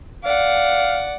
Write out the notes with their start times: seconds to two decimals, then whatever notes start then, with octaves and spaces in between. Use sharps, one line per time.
0.24 D5 F5 F#5